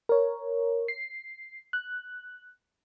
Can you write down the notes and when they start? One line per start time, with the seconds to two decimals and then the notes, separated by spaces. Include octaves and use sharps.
0.09 A#4 C#5
0.88 C7
1.73 F#6